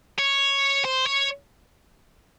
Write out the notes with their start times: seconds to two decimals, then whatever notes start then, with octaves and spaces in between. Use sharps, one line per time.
0.19 C#5
0.85 C5
1.06 C#5